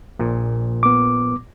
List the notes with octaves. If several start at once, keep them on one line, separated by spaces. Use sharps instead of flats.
A#1 A#2
B3 D6